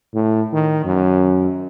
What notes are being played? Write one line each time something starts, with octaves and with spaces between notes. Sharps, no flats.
A2
D#3
F#2